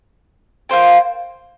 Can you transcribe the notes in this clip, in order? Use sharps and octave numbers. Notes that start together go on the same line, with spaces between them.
A#3 F4 C5 G5